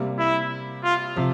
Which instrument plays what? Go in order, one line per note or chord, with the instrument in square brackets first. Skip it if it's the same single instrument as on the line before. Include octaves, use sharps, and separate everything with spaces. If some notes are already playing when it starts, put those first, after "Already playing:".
Already playing: [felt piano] C3 G3 A#3
[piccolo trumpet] E4
F4
[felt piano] C3 F3